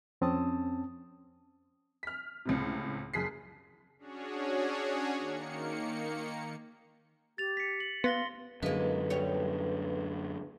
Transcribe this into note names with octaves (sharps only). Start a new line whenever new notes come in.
F2 C4 C#4 A5 D#6
F6 B6
C#2 A2 C3
F#1 G#4 B6 C7
C#4 D4 F#4 G#4 C#5
D#3 A#3 C#7
G4 A6 F7
B6 C#7
F#7
B3 F5 C6 A#6 G7
F#2 D3 G#3 A#3 A4 B4
D2 G3 C#5